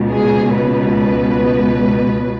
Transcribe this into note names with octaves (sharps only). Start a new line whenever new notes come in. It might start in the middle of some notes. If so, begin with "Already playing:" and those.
Already playing: C#2 B2
G#4
B4